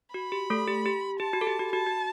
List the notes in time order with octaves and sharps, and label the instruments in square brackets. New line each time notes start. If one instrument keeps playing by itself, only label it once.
[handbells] F#4 [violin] B5
[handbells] G4
A3 A4
G4
G4
[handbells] G4 [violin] A5
[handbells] F#4
A4
G4
F#4
[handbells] F#4 [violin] A5
[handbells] F#4